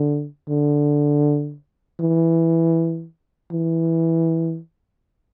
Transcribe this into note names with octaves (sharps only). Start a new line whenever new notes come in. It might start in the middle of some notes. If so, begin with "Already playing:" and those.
Already playing: D3
D3
E3
E3